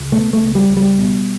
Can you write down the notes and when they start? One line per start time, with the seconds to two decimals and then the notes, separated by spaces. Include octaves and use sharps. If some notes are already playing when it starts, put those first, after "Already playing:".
Already playing: C#2
0.12 B2 A3
0.33 A3
0.40 C#2
0.55 G3
0.69 C#2
0.77 G3
0.98 B2